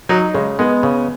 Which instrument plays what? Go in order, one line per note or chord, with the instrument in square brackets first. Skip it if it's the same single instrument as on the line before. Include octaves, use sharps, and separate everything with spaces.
[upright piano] F#3 [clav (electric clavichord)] D#4
[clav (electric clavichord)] C#3 [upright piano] G#3
[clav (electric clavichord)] G#3 [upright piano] B3
[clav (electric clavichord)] C#3